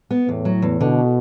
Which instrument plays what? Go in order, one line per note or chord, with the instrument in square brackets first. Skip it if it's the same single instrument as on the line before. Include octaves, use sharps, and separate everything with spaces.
[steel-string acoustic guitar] B3
[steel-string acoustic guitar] E2 [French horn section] A2
[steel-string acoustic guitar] F#3
E2
[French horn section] B2 [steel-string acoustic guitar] D3